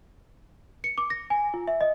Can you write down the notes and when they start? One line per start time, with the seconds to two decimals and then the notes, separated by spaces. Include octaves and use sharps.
0.84 C#7
0.98 D6
1.10 A#6
1.30 G#5
1.54 F4
1.67 E5
1.81 D#5